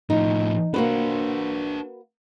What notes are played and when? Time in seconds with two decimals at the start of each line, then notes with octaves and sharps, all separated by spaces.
0.10 A2 F3 D#4
0.74 A#3 D4 F#4 B4 C5